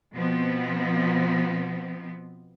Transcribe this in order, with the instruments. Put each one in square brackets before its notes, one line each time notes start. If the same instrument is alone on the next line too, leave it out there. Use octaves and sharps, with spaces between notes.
[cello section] B2 F3 B3 C4